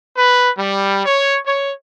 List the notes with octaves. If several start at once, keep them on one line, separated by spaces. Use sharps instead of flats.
B4
G3
C#5
C#5